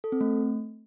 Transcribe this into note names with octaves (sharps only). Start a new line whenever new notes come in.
A4
C4
A3